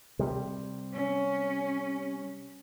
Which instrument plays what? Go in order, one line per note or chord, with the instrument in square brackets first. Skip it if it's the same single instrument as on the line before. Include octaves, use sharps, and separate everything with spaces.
[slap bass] C3 G3
[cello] C#4